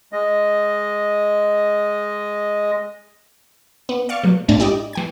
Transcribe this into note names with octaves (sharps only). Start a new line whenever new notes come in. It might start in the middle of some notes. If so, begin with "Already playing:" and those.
G#3 D#5
B3
D5 F5 C#6
B2 F#3
A1 G#2 G#3 D4 A6
E4 G4 D5 D#5
E3 G5 G#6